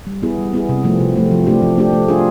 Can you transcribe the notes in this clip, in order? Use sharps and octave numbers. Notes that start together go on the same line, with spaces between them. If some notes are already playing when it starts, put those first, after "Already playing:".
G3
B3 E4 G#4
G3
B3 E4 G#4
C3
F3 A3 C4
C3
F3 A3 C4
F3
A3 D4 G4
F3
A3 D4 G4
A3
D4 F4 G#4